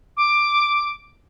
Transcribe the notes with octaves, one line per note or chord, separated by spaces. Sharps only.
D6